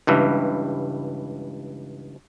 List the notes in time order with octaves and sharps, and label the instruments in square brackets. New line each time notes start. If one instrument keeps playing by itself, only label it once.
[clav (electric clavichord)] C#2 G2 E3